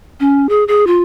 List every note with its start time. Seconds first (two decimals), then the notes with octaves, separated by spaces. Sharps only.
0.20 C#4
0.49 G#4
0.68 G#4
0.87 F4